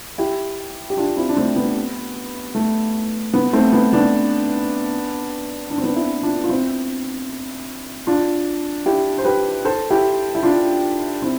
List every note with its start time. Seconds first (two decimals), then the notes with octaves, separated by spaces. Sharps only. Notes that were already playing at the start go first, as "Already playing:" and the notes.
0.18 E4 G4
0.90 G4
0.97 D4 F4
1.17 C4 E4
1.29 D4
1.37 A3 C4
1.56 B3
2.55 A3
3.34 B3
3.53 A3 C4
3.73 B3
3.93 B3 D4
5.70 D4
5.78 C4
5.84 B3 D4
5.96 C4 E4
6.23 D4 F4
6.44 F4
6.49 C4 E4
8.07 D4 F4
8.86 E4 G4
9.18 C5
9.25 G4 B4
9.65 A4 C5
9.91 E4 G4
10.35 E4
10.43 D4 F4
11.22 C4 E4